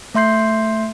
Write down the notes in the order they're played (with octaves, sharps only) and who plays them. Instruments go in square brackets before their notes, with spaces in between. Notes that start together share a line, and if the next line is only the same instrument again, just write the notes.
[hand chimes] A3 E5 C6 G6 C7